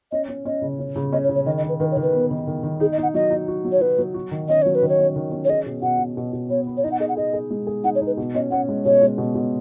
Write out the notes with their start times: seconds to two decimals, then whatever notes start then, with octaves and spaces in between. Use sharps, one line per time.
0.12 C#4 D#5
0.29 C#4
0.45 C#4 D#5
0.62 C#3
0.79 C#4
0.96 C#3
1.13 C#4 D#5
1.24 C#5
1.29 C#3
1.35 C#5
1.46 D#3 D#5
1.57 D#5
1.64 D#3
1.69 B4
1.80 D#3 B4
1.91 C#5
1.97 D#3
2.02 B4
2.14 B3
2.31 D#3
2.47 D#3
2.63 D#3
2.80 D#4 G#4
2.92 D#5
2.98 D#4 F#5
3.14 F#3 D#5
3.30 D#4
3.48 F#4
3.65 F#3
3.72 C#5
3.81 F#3 B4
3.98 F#3
4.14 F#4
4.31 D#3
4.48 C#4 D#5
4.62 F#3 C#5
4.75 B4
4.83 D#3
4.89 C#5
4.99 C#4
5.16 D#3
5.32 C#4
5.45 C#5
5.49 G#4 D#5
5.66 B2
5.82 B2 F#5
5.99 B2
6.17 B2
6.33 B2
6.50 B3 C#5
6.67 B3
6.77 C#5
6.84 D#4 D#5
6.92 F#5
7.00 G#4 D#5
7.09 F#5
7.16 G#4 D#5
7.33 G#4
7.51 G#3
7.67 G#4
7.84 D#4 F#5
7.95 C#5
8.02 D#4 B4
8.17 B2
8.35 C#4 D#5
8.51 C#4 F#5
8.69 G#3
8.85 B2 C#5
9.01 G#3
9.18 B2
9.35 B2